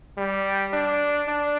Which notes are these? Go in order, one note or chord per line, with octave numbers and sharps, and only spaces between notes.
G3
D4
D4